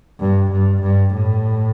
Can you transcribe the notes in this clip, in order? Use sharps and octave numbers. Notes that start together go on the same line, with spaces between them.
G2
G2
G2
A2